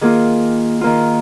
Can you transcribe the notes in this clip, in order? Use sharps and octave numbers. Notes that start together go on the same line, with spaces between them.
D#3 A#3 F4 G#4
D#3 A#3 F4